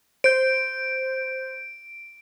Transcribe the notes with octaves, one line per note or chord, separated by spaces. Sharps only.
C5 G6 D7